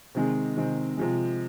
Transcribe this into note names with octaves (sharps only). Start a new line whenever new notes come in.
C3 D#3 G#3 C4
C3 D#3 G#3 C4
C3 F3 G#3